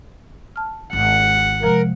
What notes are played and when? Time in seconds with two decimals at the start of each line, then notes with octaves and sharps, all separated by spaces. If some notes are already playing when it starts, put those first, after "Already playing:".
0.56 A5 F6
0.93 G#1 F#5
1.63 C3 F3 G#3 A#4